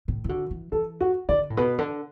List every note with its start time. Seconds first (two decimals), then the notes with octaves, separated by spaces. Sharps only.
0.08 A2
0.24 E3
0.29 D3 F#4
0.51 E3
0.72 E3 A4
1.01 F#4
1.29 D3 D5
1.50 A2
1.57 B2 B4
1.78 D3